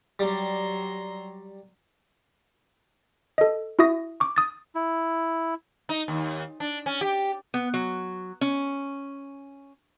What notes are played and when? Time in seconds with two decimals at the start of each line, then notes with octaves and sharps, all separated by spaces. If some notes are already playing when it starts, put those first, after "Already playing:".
0.19 F#3 G3 A#5 C6
3.38 A4 D#5
3.79 E4 F#4 E5 D#6 A#6
4.20 C#6 D6
4.36 D#6 A6
4.75 E4
5.89 D#4
6.08 D#2
6.60 D4
6.86 C#4
7.01 G4
7.54 B3
7.74 F#3
8.41 C#4